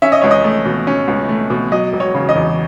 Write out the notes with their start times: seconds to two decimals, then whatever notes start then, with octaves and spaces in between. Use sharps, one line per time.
0.02 C#4 E5
0.12 D#5
0.22 C#2 C#5
0.31 D#5
0.44 A3
0.65 B2
0.87 C#4
1.08 C#2
1.29 A3
1.50 B2
1.72 F#3 D#5
1.93 E1
2.00 C#5
2.15 C#3
2.29 D#5
2.35 E2